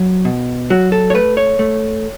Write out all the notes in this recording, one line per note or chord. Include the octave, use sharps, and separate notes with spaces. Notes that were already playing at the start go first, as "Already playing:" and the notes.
Already playing: F#3
B2
F#3 F#4
A4
C#5
A3 B4
C#5
A3